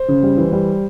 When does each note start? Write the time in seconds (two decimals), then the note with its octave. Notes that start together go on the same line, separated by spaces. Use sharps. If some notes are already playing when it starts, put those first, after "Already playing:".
Already playing: C5
0.08 C#3
0.23 G3
0.37 E3
0.52 G3